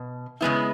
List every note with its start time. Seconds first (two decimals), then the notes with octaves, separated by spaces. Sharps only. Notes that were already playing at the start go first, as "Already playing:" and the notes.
Already playing: B2
0.41 C#3 G#3 B3 E4